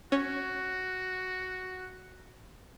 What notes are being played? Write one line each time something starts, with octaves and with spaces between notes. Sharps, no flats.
C#4 F#4